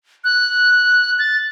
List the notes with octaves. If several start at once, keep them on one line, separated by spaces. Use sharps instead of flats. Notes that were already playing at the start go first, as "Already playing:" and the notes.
F#6
A6